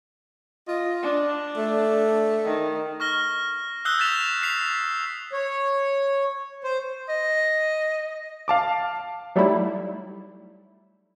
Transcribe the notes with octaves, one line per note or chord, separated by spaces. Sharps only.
F4 D#5
D4
A3
D#3
C#6 F6 A#6 G7
D#6 E6 F#6 G6 C7 G7
G6 A6 B6 E7 F7
B6 C7 F7
C#5
C5
D#5
F5 A5 D6
F#3 G3 A3 D#4 E4